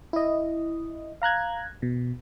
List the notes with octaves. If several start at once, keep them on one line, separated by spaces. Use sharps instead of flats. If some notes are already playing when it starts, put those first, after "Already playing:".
E4 D#5
F5 A#5 F#6 G#6
B2